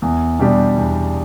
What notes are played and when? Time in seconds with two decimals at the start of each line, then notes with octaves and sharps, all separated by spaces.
0.02 E2
0.39 B2 G3 D4 G4
0.77 E2